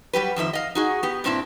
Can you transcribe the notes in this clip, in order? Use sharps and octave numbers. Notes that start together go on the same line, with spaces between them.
F#3 G3 G4 B4
F2 D#3 F3 E5
D#5 F5
D#4 F#4 G#4
B3 G4
G2 A#2 C4 D4 E4